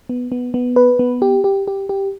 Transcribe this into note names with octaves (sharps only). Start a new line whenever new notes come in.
B3
B3
B3
B4
B3
G4
G4
G4
G4